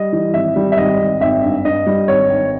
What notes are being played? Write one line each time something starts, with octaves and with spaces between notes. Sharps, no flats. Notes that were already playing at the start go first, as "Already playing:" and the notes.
Already playing: G3 D#5
E3
G#1 E5
G3
E5
G#1 D#5
G#1
G#1 E5
G2
G2 D#5
G3
G#1 C#5
G#1